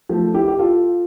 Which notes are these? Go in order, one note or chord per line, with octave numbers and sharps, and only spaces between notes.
F3 A3
E4 G4
G4
F4 A4